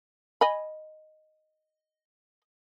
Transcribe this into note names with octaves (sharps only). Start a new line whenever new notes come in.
D#5 G#5 B5